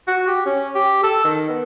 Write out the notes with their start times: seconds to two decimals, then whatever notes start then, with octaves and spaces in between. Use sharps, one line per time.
0.08 F#4
0.28 G4
0.46 C#4
0.75 G4
1.03 A4
1.25 D#3
1.49 B3